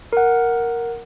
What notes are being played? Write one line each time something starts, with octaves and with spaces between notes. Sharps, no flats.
A#4 F#5